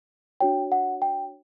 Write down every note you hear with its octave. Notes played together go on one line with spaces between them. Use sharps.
D4 F#4 C#5 G5
F#5
G5